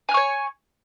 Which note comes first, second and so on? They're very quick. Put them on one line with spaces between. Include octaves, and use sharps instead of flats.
G#5 F6 C#6 C#5